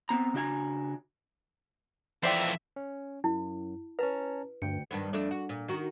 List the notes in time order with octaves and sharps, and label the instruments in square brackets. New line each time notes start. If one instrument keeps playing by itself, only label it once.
[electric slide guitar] B3 C4 A#5
C#3 D4 F#4 D#5 G#5 A#5
[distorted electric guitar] F2 E3 [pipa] C5 D5 G5 [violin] E5
[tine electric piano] C#4
[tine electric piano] F#2 [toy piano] E4
[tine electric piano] C#4 A5 A#5 [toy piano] B4
[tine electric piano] D2 G5 C#7 [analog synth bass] G2
[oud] G2 D#3 B3
F2 A3 D4
F#4
A#2
D#3 F#4